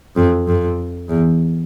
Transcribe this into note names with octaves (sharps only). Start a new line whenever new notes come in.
F2
F2
E2